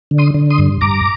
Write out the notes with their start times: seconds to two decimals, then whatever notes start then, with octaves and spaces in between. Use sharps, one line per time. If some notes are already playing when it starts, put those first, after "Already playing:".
0.11 D3
0.18 C6 D#6
0.34 D3
0.50 C6 D#6
0.58 G2
0.81 G2 A#5 D6